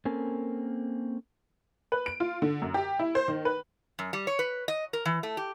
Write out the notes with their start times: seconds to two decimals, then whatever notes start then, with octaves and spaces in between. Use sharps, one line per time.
0.05 A#3 C4 C#4 A4 A#4 G#5
1.92 B4
2.06 D7
2.20 F4
2.42 D3
2.62 F#2
2.74 G4
2.99 E4
3.15 C5
3.28 D#3
3.45 B4
3.99 F#2
4.13 G3
4.27 C#5
4.39 B4
4.68 D#5
4.93 A#4
5.05 E3
5.23 A3
5.37 G4